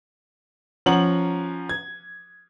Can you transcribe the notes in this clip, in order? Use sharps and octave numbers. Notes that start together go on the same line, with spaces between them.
F3 C#4 F#5 A#5 F#7
G#6